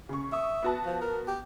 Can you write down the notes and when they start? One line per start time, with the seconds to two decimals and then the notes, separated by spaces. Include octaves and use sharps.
0.09 C#3 C#6
0.32 E5 C#6 D#6
0.62 B3 F#4 A5
0.86 F3
1.01 A#4
1.27 G4